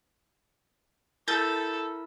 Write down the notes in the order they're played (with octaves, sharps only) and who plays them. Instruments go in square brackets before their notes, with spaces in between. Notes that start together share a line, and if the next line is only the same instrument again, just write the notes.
[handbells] E4 A#4 E6 [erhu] A4 [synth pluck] G6 A6